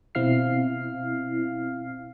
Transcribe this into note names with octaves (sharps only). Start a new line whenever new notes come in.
B2 C4 E4 F5 F6 C7